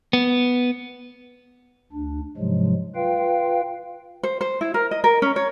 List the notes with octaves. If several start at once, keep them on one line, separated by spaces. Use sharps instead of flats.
B3
D2 D4
G#2 C3 F3 F#3 G#3
F4 B4 F5 G5
C5
C5
E4
A#4
D#5
A#4
C#4
C#5